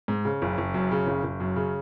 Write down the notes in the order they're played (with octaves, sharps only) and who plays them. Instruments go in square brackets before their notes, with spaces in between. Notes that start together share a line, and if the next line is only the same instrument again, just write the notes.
[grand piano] G#2
C#3
F#1
F#1
F#2
C#3
F#1
F#1
F#2
C#3